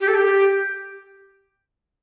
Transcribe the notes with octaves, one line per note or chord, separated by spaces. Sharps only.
G4
A4
G4